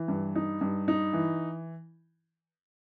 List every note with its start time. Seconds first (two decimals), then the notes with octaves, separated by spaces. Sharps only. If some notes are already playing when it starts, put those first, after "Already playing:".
Already playing: E3
0.08 G2
0.35 D#4
0.61 G2
0.88 D#4
1.13 E3